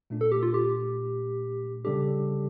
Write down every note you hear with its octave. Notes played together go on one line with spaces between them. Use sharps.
A#2 A3 D4
A4
G4
F4
G4
C#3 G3 D4 G4 A4